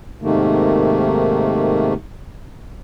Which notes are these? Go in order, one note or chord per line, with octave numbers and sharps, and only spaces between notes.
G#2 C3 D#3 A3 A#3